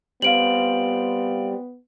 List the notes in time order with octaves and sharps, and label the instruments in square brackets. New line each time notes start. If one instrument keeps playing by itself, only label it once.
[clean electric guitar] G3 C4 F4 [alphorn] B3 [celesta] F5 D7 F#7